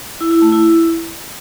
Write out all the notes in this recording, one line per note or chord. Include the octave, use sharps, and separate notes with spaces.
E4
E4
A3
E4